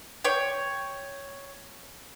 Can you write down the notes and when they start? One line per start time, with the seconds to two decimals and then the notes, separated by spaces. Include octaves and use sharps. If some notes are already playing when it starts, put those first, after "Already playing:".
0.24 C#5 G5